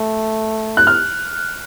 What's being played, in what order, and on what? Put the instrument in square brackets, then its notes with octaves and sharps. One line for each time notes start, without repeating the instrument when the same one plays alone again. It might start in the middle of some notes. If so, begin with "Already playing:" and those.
Already playing: [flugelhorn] A3
[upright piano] F#6
F6